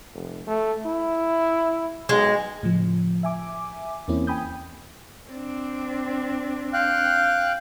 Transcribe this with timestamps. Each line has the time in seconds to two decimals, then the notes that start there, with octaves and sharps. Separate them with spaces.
0.14 F1
0.47 A3
0.86 E4
2.09 B1 G#3
2.63 A2 C#3 F3
3.23 E5 G#5 D6
4.08 E2 A#3 C4 C#4 E4
4.27 G5 G#5 B5 D#6 G6
5.30 C4 D4
6.73 F5 G5 F#6